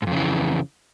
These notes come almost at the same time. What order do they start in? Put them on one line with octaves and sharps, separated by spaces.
G#2 F2 C#3 E3